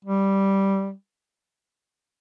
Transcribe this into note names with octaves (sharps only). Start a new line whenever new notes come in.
G3